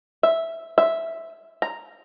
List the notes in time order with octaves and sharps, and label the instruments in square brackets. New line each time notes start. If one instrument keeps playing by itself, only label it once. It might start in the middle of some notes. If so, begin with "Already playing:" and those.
[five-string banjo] E5
E5
A#5